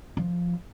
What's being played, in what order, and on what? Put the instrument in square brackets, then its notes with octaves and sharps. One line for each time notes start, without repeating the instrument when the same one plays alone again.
[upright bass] F3